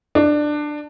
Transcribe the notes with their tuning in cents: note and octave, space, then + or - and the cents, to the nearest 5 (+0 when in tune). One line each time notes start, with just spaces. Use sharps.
D4 +15